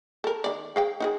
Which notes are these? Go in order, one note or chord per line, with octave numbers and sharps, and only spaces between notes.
A4 A#4
D#3 D5
G#4 F5 G5
D#4 F#4 G#4